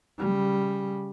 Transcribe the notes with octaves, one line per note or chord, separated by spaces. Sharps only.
C#3 G3